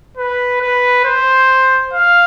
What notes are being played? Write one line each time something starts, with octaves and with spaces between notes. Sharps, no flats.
B4
B4
C5
F5